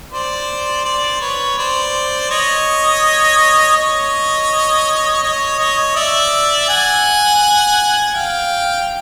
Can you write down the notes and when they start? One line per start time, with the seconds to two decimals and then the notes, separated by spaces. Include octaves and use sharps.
0.12 C5 D5
0.85 C5 D5
1.21 B4 C#5
1.58 C5 D5
2.30 C#5 D#5
3.76 C#5 D#5
5.23 C#5 D#5
5.59 C#5 D#5
5.95 D5 E5
6.68 F#5 G#5
8.15 F5 G5